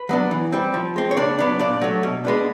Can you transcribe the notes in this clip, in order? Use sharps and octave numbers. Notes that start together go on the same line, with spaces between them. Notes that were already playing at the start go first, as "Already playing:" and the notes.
Already playing: B4
F#3 B3 D4
E3
G3 C4
F3
G#3 C4
C#5
C#3 D4 D5
F#3 B3 D4
A#2 D4 D5
F#3 A3
B2
G#3 B3 D4